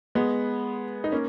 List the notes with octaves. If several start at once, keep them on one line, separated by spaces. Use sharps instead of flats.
G#3 B3
D#4
A#3 C#4